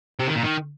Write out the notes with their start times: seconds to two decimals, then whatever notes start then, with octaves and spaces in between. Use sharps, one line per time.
0.19 C3
0.27 D#3
0.35 A#2
0.43 D#3